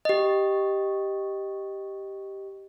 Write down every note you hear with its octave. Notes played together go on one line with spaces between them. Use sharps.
G4 D#5